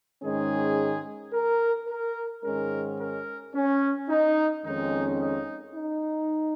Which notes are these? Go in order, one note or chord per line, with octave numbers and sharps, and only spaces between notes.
G#2 D#3 G#3 C#4 G#4
A#4
A#4
G#2 D#3 G#3 C#4 A#4
A#4
C#4
D#4
F2 D#3 G#3 C#4 D#4
D#4
D#4